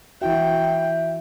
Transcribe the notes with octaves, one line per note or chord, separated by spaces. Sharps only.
E3 E4 F#4 E5 G5